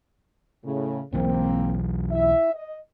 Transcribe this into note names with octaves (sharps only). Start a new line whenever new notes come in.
A2 C#3
B1 E3 F#3 A#3 C4
E4 E5
D#5